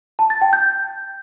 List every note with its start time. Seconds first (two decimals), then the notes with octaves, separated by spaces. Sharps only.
0.19 A5
0.30 A6
0.41 G5
0.53 G6